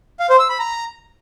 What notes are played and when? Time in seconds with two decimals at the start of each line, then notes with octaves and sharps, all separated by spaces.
0.20 F5
0.29 C5
0.39 E6
0.49 B5
0.59 A#5